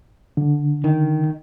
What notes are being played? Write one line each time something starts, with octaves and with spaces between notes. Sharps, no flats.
D3
D#3